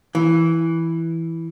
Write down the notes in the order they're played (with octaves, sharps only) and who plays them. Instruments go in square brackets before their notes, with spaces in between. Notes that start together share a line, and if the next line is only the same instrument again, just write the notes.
[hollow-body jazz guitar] E3